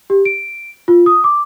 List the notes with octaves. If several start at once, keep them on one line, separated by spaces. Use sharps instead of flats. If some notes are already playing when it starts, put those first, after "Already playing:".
G4
D7
F4
D#6
D6